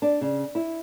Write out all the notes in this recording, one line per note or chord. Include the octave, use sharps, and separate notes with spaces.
D4
C#3
E4